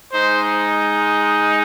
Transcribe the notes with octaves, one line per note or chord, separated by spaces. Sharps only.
G#3 D#4 C5